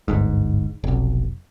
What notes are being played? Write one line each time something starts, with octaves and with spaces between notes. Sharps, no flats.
D1 G1 G#2
F1 B1